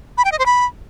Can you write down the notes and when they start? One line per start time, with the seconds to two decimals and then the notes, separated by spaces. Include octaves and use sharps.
0.18 B5
0.25 G5
0.32 D#5
0.39 C5
0.46 B5